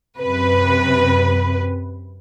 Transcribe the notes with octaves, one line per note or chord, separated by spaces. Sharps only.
F#2 C3 B4